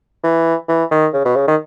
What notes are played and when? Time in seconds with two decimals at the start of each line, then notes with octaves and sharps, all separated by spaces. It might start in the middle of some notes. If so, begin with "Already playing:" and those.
0.24 E3
0.69 E3
0.91 D#3
1.14 C#3
1.25 B2
1.36 C#3
1.48 D#3